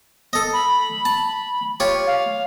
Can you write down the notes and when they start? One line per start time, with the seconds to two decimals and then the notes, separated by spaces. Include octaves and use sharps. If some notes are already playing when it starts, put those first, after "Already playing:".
0.33 A4 D#5
0.53 B5
1.05 A5
1.80 F4 G4 C#5
2.07 F5